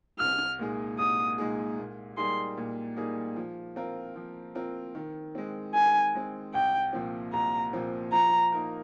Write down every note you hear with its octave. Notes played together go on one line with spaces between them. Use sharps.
C2 F6
A#2 G#3 D#4 G#4
C2 D#6
A#2 G#3 D#4 G#4
A#2
G3 A#3 D#4 G#4 C6
A#2
G3 A#3 D#4 G#4
F3
C4 F4 A#4
F3
C4 F4 A#4
D#3
G#3 C4
D#3 G#5
G#3 C4
C2 G5
A#2 F3 C4
C2 A#5
A#2 F3 C4
F3 A#5
A#3 D#4 A#4